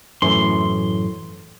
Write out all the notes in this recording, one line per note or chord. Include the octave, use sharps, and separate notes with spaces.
F#2 A2 E3 C6